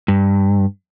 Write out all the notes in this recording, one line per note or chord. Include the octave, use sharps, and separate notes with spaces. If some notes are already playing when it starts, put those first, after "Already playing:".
G2